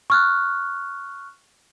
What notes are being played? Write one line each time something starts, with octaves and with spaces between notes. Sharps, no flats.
C#6 F6 F#6